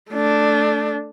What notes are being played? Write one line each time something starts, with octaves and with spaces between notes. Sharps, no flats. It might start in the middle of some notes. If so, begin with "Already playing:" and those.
A3 D4